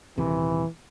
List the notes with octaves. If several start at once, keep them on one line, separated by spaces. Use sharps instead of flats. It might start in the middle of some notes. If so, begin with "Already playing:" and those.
D#1 C3 E3